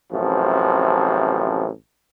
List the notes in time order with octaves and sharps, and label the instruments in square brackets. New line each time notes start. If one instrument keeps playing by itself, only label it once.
[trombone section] A1 F#2 C3 F3